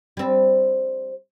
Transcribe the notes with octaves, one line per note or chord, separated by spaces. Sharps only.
G3 C4